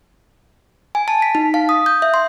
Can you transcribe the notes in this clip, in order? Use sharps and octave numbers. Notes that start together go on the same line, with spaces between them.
G#5
A5
B6
D#4
F5
D#6
G6
E5
C6